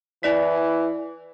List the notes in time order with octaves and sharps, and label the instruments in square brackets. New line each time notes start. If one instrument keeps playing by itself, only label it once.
[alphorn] E3 [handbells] E4 D5 B6